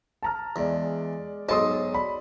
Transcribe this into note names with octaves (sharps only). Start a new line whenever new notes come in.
A5 A#5 F6
E2 G#3 D5
B1 G#2 D#5 A5 C6 D#6
D5 B5